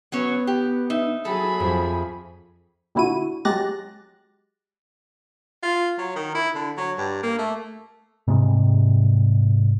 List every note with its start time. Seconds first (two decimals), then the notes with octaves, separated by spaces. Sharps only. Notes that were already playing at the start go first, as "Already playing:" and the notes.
0.12 F#3 B3 C#4 C#5
0.47 G4
0.90 D#4 E5
1.25 F#3 G#4 A4 B5
1.60 F2
2.95 A#2 D3 E4 F#4 D#7
3.45 F#3 G#3 G4 F#6 A6 A#6
5.63 F4
5.98 F#3
6.16 D#3
6.34 E4
6.55 D3
6.77 F#3
6.98 G2
7.23 A#3
7.38 A3
8.27 G#2 C3 G3 G#3